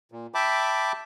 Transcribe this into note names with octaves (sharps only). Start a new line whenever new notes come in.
A#2
E5 G5 A5 B5 D6